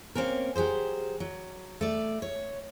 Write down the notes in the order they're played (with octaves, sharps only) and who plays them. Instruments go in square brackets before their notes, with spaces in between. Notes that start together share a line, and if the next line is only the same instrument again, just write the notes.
[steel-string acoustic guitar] A#3 C4 C#4 A#4
F#3 G4 G#4 C5
F#3
A3 D5
C#5